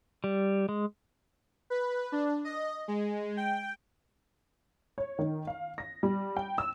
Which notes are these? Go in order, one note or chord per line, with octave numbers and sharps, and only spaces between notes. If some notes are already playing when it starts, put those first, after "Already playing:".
G3
G#3
B4
D4
D#5
G#3
G5
C#5
D#3
F5
A#6
G3
G5
E6